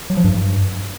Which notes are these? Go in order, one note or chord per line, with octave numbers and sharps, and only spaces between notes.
F#3
F3
G2